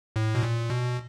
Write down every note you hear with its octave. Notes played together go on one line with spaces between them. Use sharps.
A2
B2
A#2
B2